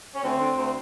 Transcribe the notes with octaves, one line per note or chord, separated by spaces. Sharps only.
C#4
D2 C4
D3
D2